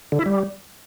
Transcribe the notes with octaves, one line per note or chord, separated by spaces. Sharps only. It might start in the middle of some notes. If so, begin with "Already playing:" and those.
D3
E4
G3